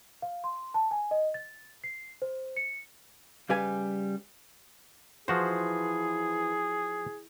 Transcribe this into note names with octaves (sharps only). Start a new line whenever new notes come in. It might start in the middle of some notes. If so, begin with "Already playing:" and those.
F5
C6
A5
G#5
D#5
A6
C7
C5
C#7
C#3 G3 B4 G#5
E3 F3 F#4 G#4 C5